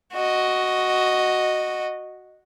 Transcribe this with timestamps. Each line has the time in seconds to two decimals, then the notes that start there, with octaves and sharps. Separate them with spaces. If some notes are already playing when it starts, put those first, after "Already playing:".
0.13 F#4 D#5